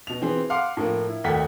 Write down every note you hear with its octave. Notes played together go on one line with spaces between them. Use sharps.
B2 F7
E3 C4 G#4
F5 F#5 C6 D6
A2 F3 A#3
E4
G#1 D#2 A3 A#4 F#5 B6